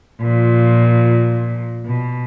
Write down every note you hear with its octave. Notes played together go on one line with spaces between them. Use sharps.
A#2 F3
B2